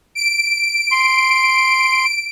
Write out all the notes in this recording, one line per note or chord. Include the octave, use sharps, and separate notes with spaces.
D7
C6